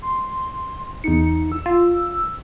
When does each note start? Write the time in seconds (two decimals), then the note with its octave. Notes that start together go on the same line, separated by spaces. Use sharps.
0.02 C6
1.04 E2 D#4 C#7
1.52 E6
1.66 F4